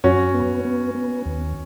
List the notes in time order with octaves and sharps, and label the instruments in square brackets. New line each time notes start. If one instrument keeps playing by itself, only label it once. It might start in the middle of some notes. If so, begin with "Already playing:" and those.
[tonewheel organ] F#2 [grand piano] C#4 F#4
[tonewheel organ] B3
B3
B3
D#2